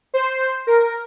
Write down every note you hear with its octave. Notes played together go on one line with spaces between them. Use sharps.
C5
A#4